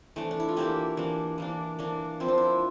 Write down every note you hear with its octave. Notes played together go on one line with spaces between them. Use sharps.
E3 A3 D4
D4
E4
F4
E3 A#3 D4 E4 G4
E3 A#3 D4
E3 A#3 D4
E3 A#3 D4
F3 C4 E4
D4
E4